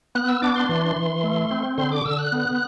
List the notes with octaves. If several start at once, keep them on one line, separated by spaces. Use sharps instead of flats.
B3 F#6
E6
D4 D6
C6
E3
E3
A3
C4
D3 C6
D6
D3 E6
F#6
B3